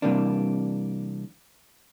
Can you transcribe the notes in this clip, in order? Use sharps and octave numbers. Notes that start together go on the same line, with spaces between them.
C3 E3 G3 A#3 C4 D4